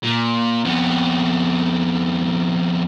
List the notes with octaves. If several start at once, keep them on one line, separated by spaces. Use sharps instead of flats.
A#2
F2 B3